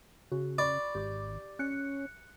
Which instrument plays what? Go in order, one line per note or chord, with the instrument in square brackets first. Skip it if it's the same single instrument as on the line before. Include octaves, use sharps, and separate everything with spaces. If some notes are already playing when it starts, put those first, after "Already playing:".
[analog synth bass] C#3 [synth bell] F#4
[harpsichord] D5 [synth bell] B5 C#6 D6
[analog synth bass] G#1 [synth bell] G4 D6
[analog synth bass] C#4 [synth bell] F#6 C#7